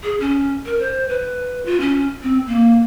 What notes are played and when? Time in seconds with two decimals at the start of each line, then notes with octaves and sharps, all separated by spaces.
0.04 G#4
0.21 C#4
0.66 A#4
0.80 C5
1.09 B4
1.66 F4
1.80 C#4
2.23 C4
2.47 A#3